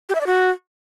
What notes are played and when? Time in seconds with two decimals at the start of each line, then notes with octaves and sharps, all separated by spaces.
0.09 G4
0.15 E5
0.21 D5
0.27 F#4